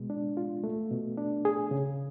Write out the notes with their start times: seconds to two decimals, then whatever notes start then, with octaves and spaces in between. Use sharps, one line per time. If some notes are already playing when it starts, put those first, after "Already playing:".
Already playing: B2 G#3
0.10 D4
0.37 F4
0.64 A3
0.91 B2
1.18 D4
1.45 G#4
1.71 C#3